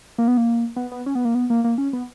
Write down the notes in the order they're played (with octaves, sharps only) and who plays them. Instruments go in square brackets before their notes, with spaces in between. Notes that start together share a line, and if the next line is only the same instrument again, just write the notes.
[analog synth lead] A#3
B3
A#3
B3
B3
C#4
B3
A#3
B3
A#3
A#3
C#4
B3